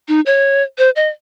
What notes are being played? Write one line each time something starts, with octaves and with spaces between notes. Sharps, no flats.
D#4
C#5
C5
D#5